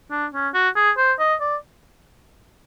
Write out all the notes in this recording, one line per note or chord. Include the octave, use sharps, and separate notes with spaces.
D4
C#4
F#4
G#4
C5
D#5
D5